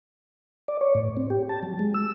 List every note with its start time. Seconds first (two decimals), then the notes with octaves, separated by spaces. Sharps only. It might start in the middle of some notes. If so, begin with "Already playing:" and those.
0.68 D5
0.81 C#5
0.95 A2
1.17 C4
1.30 G4
1.49 A5
1.63 F#3
1.79 G#3
1.94 E6